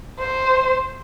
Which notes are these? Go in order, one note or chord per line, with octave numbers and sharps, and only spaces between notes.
C5